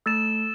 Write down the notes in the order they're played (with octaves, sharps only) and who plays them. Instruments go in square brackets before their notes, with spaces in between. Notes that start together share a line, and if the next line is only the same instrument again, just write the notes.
[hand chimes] A3 A4 [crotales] E6 A6 E7